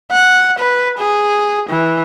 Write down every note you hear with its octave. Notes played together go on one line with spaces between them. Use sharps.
F#5
B4
G#4
E3